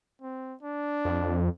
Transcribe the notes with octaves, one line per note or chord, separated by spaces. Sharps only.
C4
D4
F2